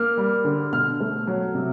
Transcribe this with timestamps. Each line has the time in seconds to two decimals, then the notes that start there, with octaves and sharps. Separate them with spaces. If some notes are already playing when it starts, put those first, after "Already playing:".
Already playing: A#3 F6
0.18 G3
0.45 D3
0.73 B2 F6
1.00 A3
1.27 F#3
1.55 C3